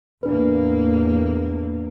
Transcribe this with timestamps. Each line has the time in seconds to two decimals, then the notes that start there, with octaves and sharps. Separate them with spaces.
0.23 E2 A2 A#3 D4 B4